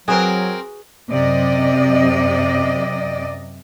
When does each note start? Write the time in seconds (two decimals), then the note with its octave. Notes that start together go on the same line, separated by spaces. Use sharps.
0.08 F#3 C4 F#4 G#4 A#4 B4
1.09 F#2 C3 D5 D#5